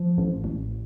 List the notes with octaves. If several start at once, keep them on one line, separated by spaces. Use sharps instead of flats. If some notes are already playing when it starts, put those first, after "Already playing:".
Already playing: F3
A1
A1